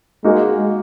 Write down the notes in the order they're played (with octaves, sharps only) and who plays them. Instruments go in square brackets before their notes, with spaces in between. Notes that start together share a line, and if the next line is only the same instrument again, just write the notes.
[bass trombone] G#3 [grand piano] A#3 D#4 F#4